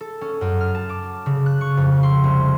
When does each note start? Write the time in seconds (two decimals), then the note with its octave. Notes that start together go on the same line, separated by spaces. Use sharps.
0.01 A4
0.21 C#4
0.41 F#2
0.61 F6
0.75 A5
0.89 D6
1.26 C#3
1.46 F#6
1.61 C#6
1.77 F2
2.03 C6
2.24 C2